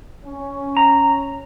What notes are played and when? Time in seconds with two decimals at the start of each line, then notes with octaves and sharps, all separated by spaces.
0.25 C#4
0.77 A#5